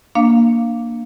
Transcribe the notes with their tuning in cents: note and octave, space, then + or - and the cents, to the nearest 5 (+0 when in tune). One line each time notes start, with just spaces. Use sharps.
A#3 +0 D4 +0 F5 +0